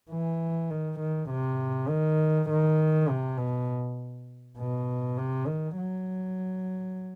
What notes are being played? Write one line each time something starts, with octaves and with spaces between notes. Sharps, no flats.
E3
D#3
D#3
C3
D#3
D#3
C3
B2
B2
C3
D#3
F#3